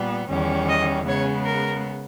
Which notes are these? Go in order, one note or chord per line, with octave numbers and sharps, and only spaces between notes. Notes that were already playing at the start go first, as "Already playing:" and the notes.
Already playing: A#2 G3 B3
E2 D#3 G3 C#4
D#5
C#3 G#3 B3 C#5
A#4